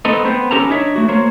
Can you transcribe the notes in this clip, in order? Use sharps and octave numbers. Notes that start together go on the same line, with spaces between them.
A3 B3 C4 D#4 A4 D#5
B3 C4 C5
B3 C#4 G4 A4 A#4 A#5
D4 D#4 C#5 E5
A3 F#4
A#3 C5 C#5